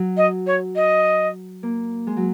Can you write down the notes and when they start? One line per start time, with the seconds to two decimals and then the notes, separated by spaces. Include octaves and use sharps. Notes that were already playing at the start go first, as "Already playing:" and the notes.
Already playing: F#3
0.17 D#5
0.46 C#5
0.75 D#5
1.63 A#3
2.07 G#3
2.17 F#3